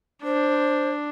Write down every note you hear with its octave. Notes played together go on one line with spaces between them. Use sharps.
D4 C5